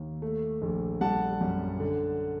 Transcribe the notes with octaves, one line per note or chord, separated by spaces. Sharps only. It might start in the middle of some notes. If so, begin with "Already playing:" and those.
Already playing: D#2
A3
A#1
G3 F#5 A5
F#2
D3